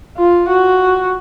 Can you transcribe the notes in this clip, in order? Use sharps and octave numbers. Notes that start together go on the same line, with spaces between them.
F4
F#4